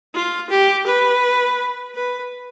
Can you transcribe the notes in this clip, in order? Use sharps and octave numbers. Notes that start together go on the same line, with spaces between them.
F4
G4
B4
B4